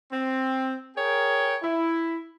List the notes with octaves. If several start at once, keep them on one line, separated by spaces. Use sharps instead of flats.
C4
G#4 A#4 C#5 G5
E4